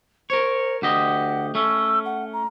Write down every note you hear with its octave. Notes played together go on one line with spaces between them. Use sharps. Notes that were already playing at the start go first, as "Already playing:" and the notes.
A#4 C5 C#5
D2 G4 D#5 F#5
A3 C#4 E6
F#5
A#5